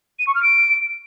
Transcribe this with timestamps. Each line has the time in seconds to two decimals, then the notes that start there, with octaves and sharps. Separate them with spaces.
0.19 D#7
0.27 C#6
0.35 F6
0.43 D7